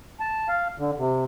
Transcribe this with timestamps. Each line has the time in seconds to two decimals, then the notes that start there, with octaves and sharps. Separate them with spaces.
0.20 A5
0.49 F5
0.78 D3
0.98 C3